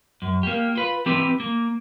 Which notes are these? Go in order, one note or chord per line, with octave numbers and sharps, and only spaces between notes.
F#2
A#3 G4
F4 B4
E3 C4 E4 G4 B4
A#3